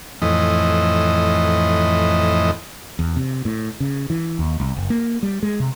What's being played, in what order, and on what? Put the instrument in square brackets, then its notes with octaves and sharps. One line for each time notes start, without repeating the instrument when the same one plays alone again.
[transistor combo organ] F2 A2 E3 D#5
[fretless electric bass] E2
C3
A2
C#3
E3
D#2
C2
F#1
A#3
G3
G#3
C3